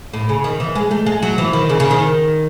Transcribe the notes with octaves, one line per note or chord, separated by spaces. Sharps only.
A2
C#3
D#3
E3
G#3
A3
G#3
F#3
E3
D#3
C#3
C#3
D#3